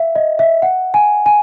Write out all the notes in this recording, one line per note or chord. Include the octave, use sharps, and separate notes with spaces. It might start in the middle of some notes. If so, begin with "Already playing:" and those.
Already playing: E5 F5
D#5
E5
F#5
G#5
G#5